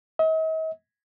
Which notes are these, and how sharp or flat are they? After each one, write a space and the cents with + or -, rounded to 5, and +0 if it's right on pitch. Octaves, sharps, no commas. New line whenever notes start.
D#5 +45